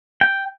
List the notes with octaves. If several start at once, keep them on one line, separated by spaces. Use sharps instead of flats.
G5